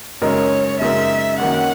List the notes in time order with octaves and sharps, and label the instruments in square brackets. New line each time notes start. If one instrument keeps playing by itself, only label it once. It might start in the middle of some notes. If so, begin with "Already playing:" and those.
[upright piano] F#2 C#3 G#3 D#4 A#4 [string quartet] C#5
[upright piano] F#2 C#3 G#3 D#4 A#4 [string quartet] E5
[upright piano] F#2 D#3 A#3 C#4 [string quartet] F#5